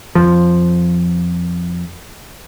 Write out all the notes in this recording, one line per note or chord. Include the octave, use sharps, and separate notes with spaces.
F2 F3